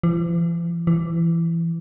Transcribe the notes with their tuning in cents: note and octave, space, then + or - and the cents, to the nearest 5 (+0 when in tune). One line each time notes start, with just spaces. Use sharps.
E3 +45
E3 +20